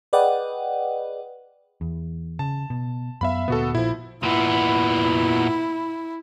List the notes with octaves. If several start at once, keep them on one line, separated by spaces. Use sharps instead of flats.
G#4 B4 D5 D#5 F#5 G5
E2
C#3 A5
B2
F#2 B3 E5 F5 B5
D2 A#2 B3 F#4 A4
A#1 A#2 F3 E4
A#2 B3 E4